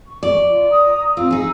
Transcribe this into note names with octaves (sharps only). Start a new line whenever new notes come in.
C#6
D5
F4
A#5 D#6
C4 F4 E6
D#4 G#4